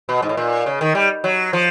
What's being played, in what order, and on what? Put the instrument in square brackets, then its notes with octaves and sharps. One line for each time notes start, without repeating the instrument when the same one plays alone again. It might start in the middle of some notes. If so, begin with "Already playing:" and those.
[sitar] B2
G#2
A2
A#2
C#3
D#3
G3
F#3
F3